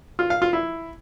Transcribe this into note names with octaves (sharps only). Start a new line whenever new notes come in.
F4
F5
F4
E4